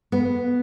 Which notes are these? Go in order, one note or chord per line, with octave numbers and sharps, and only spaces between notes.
B3